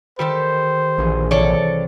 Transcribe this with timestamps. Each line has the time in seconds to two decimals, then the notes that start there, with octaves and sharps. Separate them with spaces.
0.19 D#3 G3 G4 A4 C5
0.98 A#1 E3 G#4
1.31 C2 A4 C#5 D5